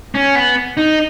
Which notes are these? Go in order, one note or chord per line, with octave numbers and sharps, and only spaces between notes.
C#4
B3
D#4